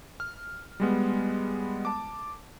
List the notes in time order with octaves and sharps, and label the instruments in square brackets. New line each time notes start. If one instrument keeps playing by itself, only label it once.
[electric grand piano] F6
G3 G#3 B3
A5 D6